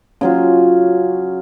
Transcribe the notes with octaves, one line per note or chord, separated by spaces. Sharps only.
C#3 F#3 F4